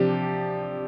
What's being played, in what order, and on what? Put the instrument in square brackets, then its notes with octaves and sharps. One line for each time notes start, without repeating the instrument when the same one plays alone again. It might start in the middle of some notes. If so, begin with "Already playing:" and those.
Already playing: [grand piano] C3 F3 D4 [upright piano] G4